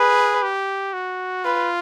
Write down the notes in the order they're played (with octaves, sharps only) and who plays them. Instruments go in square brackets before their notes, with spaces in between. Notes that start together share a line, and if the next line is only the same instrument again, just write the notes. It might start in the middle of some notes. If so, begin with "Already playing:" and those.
Already playing: [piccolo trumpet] G#4 [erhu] B4
[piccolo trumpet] G4
F#4
[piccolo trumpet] F4 [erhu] B4